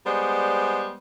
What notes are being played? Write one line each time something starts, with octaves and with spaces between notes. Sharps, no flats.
G3 G#3 B3 G#4 C5 D5